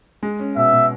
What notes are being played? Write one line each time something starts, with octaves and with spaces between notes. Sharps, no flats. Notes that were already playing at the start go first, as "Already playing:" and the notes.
G#3
C#4
B2 E5
B2